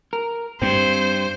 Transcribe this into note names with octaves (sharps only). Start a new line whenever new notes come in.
A#4
G2 C4 C5